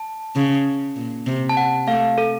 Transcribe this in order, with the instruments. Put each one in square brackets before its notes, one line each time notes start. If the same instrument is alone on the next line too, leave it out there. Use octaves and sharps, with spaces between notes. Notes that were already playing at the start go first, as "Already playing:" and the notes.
Already playing: [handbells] A5
[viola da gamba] C#3
A#2
C3
[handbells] A5
F#5
[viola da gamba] A3 [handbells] F5
[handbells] A4